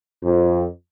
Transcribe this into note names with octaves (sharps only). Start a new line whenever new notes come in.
F2